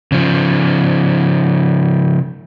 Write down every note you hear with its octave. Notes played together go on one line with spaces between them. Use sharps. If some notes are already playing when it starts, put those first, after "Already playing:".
C#3 F3